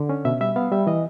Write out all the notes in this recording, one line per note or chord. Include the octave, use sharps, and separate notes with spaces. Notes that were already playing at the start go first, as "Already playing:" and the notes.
Already playing: D3
C#4
B2 E5
G3 E5
B3 F5
G3 E5
E3 D#5